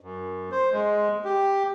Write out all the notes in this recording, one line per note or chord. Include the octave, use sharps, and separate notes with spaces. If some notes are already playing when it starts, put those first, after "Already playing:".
F#2
C5
G#3
G4